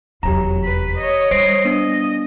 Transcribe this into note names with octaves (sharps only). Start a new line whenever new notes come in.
F1 E2 F#3 G4 A#5
B4
C#5 D#5
G3 C5 C7 D7
B3 D4 D#5